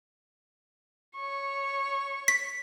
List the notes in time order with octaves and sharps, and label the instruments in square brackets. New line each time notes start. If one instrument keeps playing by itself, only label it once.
[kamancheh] C#5 C#6
[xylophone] B6